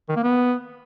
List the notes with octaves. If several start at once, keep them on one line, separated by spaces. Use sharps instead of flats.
D#3
A#3
B3